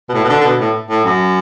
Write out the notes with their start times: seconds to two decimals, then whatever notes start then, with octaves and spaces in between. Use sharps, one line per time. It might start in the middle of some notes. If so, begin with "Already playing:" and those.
0.09 B2
0.14 A2
0.24 B2
0.29 D3
0.40 D3
0.44 B2
0.59 A2
0.90 A2
1.05 F#2